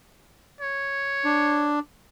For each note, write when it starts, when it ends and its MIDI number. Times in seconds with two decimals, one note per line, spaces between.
0.61 1.74 73
1.25 1.79 62